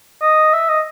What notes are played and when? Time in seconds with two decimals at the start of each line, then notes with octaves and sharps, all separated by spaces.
0.22 D#5
0.53 E5
0.69 D#5